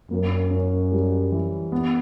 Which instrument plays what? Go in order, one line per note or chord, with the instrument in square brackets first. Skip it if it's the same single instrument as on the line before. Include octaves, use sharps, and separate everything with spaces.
[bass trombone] F#2 [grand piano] A#3
[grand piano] C#4
G3
E3
B3